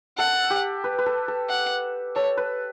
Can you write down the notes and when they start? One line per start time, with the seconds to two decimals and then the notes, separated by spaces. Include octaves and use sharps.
0.18 A4 F#5
0.50 G4
0.84 B4
0.98 B4
1.06 A4
1.28 A4
1.50 F#5
2.15 A4 C#5
2.37 B4